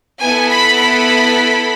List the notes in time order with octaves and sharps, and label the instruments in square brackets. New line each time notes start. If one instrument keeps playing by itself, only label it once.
[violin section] B3 E4 A4 G#5
B5
B5